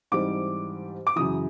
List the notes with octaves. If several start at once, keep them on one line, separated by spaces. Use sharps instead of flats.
G#2 E3 G3 C4 D#4 D6
D6
F#2 C#3 E3 D#6